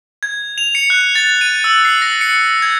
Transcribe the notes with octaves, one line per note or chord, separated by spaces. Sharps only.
G#6
F7
C#7
F#6
A6
D#7
E6
C7
A#6
C#7
G#6